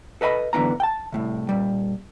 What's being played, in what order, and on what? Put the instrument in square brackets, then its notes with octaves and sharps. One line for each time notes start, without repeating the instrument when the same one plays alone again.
[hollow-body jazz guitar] A4 B4 D#5 G5 B5
F#2 D3 E3 B3 A#5
G5 A5
C2 A2 C3
A#2 G3